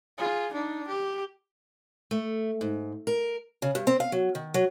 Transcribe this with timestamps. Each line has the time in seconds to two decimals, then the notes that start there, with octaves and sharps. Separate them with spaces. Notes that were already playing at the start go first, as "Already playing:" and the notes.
0.18 F4 G#4
0.53 D4 D#4
0.88 G4
2.11 A3
2.61 G#2
3.07 A#4
3.62 C#3
3.75 G2
3.87 C4
4.00 F5
4.12 F#3
4.35 D#3
4.54 F#3